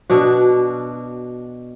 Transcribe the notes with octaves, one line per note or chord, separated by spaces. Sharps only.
B2 D4 F#4